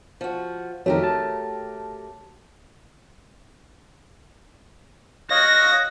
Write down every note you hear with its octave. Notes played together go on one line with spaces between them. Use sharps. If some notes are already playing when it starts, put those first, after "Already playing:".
F3 F#4
F2 D#3 A3 F#4 G4 A#4 C#5
A5
F#4 C#5 D#5 F5 A#6